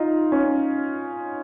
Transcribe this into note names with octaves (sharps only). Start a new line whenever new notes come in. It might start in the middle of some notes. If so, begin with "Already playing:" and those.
Already playing: D#4 F4
C#4